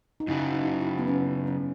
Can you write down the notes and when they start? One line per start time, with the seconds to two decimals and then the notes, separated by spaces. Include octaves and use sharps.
0.20 D#4
0.27 F#2 C#3 F#3 E4
0.54 D#4
0.81 E4
0.98 B3
1.08 C#4
1.47 C#4